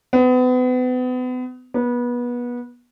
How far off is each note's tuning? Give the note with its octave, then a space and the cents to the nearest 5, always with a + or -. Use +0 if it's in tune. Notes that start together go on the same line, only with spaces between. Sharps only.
B3 +35
B3 -25